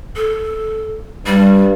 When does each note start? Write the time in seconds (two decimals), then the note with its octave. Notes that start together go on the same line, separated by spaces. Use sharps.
0.16 A4
1.26 G2 G3